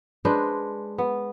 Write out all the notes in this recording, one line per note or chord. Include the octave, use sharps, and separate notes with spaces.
G#3 D4 B4 C5
B3